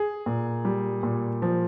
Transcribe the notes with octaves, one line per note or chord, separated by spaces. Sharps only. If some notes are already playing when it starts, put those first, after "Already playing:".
Already playing: G#4
A#2
G3
A#2
F3